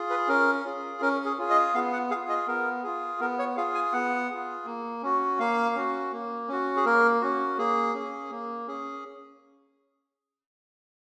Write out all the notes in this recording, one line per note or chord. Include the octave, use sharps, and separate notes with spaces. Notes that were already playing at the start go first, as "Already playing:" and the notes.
Already playing: F4 G#4
B4
C#4 A#4
F4 G#4
C#4 A#4
G#4
F4 G#4
D#5
B3 F5
F#5
F4 G#4 F5
D#5
B3 A#4
F4 G#4
B3 A#4
C#5
F4 G#4 F5
G#5
B3 F#5
F4 G#4
A#3
C#4 F#4
A#3 F5
C#4 F#4
A#3
C#4 F#4
G#4
A#3 A#4
C#4 F#4
A#3 G#4
C#4 G#4
A#3
C#4 G#4